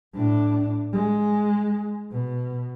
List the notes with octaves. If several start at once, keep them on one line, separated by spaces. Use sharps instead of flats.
A2 D4
G#3
B2